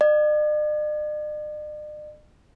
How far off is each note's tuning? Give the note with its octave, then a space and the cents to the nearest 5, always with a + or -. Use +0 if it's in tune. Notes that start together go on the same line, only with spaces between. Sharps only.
D5 +45